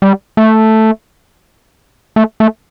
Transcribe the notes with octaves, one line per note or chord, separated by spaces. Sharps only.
G3
A3
A3
A3